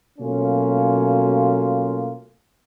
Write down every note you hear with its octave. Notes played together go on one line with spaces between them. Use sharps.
B2 F#3 A3 A#3 C#4 F4